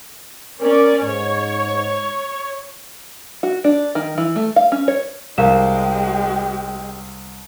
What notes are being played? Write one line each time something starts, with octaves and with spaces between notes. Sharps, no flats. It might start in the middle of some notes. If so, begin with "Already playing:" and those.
C#4 A#4 D5
G#2 C#5
F#4
D4
D#3
E3
A3
F5
C#4
C#5
C2 G#3 G4 A#4 F5 E7